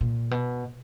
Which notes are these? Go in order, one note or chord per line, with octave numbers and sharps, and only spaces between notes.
A#2
B2